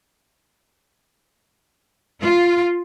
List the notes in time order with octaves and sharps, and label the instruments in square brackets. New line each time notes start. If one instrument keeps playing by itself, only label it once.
[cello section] F4